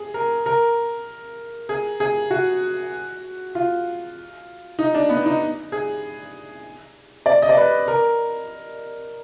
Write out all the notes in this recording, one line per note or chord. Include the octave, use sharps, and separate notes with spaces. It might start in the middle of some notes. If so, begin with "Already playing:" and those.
Already playing: G#4
A#4
A#4
G#4
G#4
F#4
F4
D#4
D4
B3
D#4
G#4
D5
D#5
D5
B4
A#4